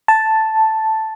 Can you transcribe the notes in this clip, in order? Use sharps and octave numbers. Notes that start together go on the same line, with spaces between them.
A5